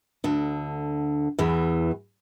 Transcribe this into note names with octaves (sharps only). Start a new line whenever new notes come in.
D2 D3
E2 E3